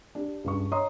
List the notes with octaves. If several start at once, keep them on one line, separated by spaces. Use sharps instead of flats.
D4 G4
C#2 G2 C#6
C#5 D#5 A#5 C6 D#6